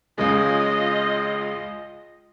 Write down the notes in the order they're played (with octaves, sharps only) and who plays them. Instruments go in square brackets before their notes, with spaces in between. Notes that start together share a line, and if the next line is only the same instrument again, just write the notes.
[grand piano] C#2 C#3 G#3 [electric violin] F4 D#5